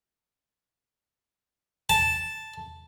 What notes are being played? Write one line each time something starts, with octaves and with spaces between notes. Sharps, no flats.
A5